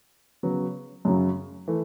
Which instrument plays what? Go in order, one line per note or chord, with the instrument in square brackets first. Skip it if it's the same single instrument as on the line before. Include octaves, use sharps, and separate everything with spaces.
[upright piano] C#3 F#3 B3
F#2 C#3 F#3
E3 A3